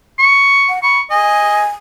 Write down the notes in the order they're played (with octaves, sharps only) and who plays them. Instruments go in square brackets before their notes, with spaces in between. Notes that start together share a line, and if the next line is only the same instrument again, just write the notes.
[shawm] C#6
[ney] F#5
[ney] B5 [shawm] C#6
[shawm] D#5 [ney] G#5